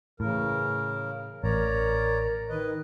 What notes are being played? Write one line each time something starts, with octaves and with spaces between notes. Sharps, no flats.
A2 C#3 E3 A#4
A1 A#4 C#5 D5 A#5
D#3 B4 D#5